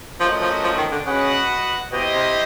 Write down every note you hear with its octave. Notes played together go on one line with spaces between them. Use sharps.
F3 A3 C#4 F#4 A#4 D#5
F3
F3
D#3
D3
C#3 F#4 B4 D#5 F#5
B2 E4 G4 C5 D#5
C3